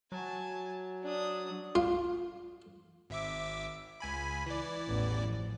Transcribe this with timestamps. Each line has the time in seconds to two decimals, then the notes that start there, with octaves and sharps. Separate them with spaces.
0.12 F#3 G#5 A5
1.03 D4 D#6
1.75 F4
3.10 G#1 E5 D6
4.00 C#2 G#5 B5
4.46 E3 D5
4.87 A1 E2
5.21 F3